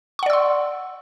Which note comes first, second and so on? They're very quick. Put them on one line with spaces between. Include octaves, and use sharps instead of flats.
C#6 F#5 D5 E6 C6